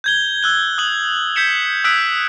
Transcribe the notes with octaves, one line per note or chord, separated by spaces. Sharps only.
G6 G#6 G7
E6 F#6 G7
D#6 F#6 F#7
G6 G#6 B6 C#7 E7
D#6 E6 F#6 G#6 B6 D7